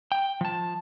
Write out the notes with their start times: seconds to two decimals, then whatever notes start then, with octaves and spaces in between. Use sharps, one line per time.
0.12 G5
0.41 F3 A5